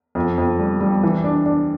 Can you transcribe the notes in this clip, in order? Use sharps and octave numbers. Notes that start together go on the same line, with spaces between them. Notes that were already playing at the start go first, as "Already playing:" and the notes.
F2
F2
G3
G3
E3
D4
D4